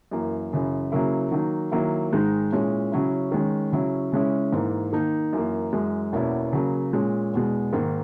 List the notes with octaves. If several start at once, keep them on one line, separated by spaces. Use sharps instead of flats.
F#2 E3 A#3
F#2 C#3 E3
C#3 F#3 A#3 E4
D#3 F#3 A#3 D#4
D#3 F#3 A#3 E4
G#2 D#3 G#3 D#4
A#2 G#3 C#4 E4
C#3 F#3 C#4 E4
D#3 G#3 C#4
C#3 F#3 C#4 E4
C#3 G#3 C#4 E4
G#2 E3 A#3
D#3 A#3 D#4
F#2 E3 A#3
F#2 E3 G#3
E2 B2 A#3 C#4 E4
C#3 F#3 A#3
A#2 G#3 C#4
E2 B2 G#3
G#2 D#3 A#3